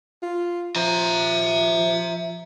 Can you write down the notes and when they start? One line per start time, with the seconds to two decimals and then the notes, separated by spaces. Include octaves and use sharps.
0.22 F4
0.76 F3 E5 A#5